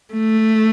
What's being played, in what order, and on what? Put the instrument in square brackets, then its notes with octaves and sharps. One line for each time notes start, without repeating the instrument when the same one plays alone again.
[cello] A3